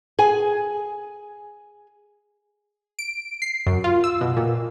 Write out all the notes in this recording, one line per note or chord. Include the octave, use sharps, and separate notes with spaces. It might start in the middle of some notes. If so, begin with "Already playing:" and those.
G#4 G#5
D7
C7
F#2
F4
E6
B2
A#2